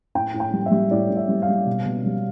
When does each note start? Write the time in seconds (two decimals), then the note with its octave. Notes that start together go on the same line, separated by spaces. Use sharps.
0.15 A2 G5
0.34 A2
0.40 G5
0.53 G3
0.66 E5
0.71 G3
0.91 A2 D5
1.10 A2
1.17 E5
1.29 G3
1.42 F5
1.49 G3
1.66 B2
1.85 B2
2.06 G3